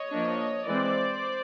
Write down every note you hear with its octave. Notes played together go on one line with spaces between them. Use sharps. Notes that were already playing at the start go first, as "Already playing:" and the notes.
Already playing: C#5 D#5
F3 A#3 D4
E3 G#3 C4 C5 D5